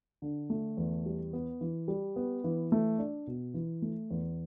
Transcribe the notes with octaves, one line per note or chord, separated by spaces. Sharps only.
D3
A3
E2
G3
B3
E3
G3
B3
E3
A3
D4
B2
E3
A3
E2